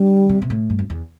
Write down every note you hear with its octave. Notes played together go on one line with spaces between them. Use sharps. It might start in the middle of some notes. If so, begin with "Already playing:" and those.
Already playing: D3 G3
C3
B2
A2
G2
F2
E2